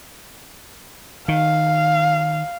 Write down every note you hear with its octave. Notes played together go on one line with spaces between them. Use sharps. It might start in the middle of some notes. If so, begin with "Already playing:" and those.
D#3 F5